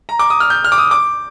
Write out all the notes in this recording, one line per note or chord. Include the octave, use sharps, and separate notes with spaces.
A#5
D6
D#6
F6
G6
F6
D6
D#6
D6